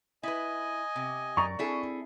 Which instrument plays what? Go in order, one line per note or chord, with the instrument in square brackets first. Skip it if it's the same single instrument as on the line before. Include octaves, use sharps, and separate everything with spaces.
[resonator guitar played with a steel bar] E4 B4 [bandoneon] D#5 G#5
[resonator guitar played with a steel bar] C3
[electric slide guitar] F#2 D5 A#5 [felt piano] C#6
[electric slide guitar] C4 E4 E5 [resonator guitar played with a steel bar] D4 G#4 A4